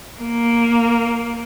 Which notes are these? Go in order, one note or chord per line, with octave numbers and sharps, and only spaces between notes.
A#3